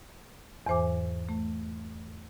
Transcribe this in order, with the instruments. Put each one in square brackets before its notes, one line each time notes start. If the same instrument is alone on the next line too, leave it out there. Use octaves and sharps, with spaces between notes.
[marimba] E2 G#2 E3 C5 G#5 D6
A3